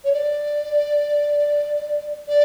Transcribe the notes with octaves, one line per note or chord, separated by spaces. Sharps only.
C#5
D5
D5